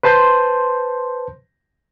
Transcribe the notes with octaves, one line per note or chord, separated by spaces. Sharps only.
B4 C5 A5 C6 G6